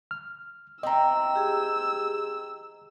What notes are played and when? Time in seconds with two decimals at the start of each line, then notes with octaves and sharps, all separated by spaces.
0.11 F6
0.83 E3 C4 D#5 A#5 E6
1.36 G4 G#4